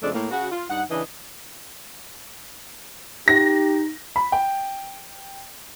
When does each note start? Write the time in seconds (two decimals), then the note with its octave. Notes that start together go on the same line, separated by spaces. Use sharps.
0.02 F2 C#3 G#3 A3 D4
0.14 A2 A#3
0.30 C#3 F#4
0.51 F4
0.70 G2 D#4 F#5
0.90 C#3 E3 D4 D#5
3.28 D#4 G4 A#6
4.16 B5
4.32 G5